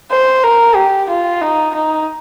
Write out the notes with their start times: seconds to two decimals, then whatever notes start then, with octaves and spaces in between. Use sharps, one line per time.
0.11 C5
0.43 A#4
0.75 G4
1.09 F4
1.41 D#4
1.74 D#4